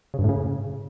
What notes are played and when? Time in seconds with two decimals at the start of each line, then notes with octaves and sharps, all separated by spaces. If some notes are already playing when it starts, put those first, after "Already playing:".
0.14 C#3
0.19 G2
0.24 A2
0.29 C#3